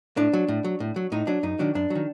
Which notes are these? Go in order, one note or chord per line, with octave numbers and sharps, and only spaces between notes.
A2 D4
F#3
A2
F#3
A2
F#3
A2 D#4
F#3 D4
F#2 D#4
D#3 F#3 D4
F#2 D4
F#3
D#3